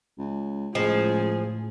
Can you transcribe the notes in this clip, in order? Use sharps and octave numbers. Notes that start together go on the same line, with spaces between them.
C#2
C#2 A2 F3 G#4 D#5